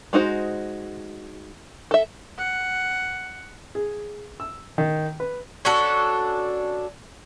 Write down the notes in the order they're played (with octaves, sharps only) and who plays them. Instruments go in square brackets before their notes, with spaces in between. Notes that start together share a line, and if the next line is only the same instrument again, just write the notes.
[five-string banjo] G#3 D#4 F#4 C5
A4 E5
[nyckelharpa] F#5
[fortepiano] G#4
E6
D#3
B4
[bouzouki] C#4 D4 F#4 A4